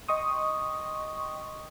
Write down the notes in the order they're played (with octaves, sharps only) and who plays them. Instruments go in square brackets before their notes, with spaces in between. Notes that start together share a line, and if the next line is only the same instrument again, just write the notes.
[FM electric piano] D#5 G5 C6 C#6 D#6